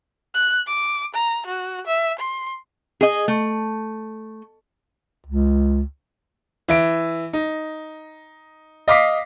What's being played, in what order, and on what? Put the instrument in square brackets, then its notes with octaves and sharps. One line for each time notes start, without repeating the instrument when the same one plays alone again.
[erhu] F#6
D6
A#5
F#4
E5
C6
[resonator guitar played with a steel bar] G#4 D#5
A3
[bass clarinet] C#2
[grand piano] E3 E5 D7
D#4
D#5 F5 D6 B6 C7